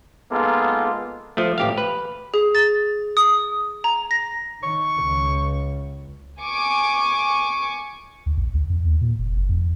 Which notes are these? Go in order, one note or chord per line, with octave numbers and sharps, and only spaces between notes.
G#3 A#3 B3 D#4 F4 A4
F3 A3
A1 G4 F5
B4
G#4
A6
D#6
A#5
A#6
D#3 C#6
C#2
G#5 C#6 D6
D2
A#1
D2
F2
D#2
A#2
F1
F#1
F2